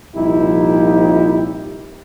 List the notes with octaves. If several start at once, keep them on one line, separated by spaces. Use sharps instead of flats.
C2 A#2 F3 D#4 E4 G4